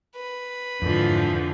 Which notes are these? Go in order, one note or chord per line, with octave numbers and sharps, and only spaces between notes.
B4
F2 G#2 D3 E3 F3